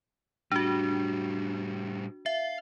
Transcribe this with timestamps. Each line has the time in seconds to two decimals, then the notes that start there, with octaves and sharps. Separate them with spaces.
0.52 A2 G3 D4 F#4
2.26 E5 F5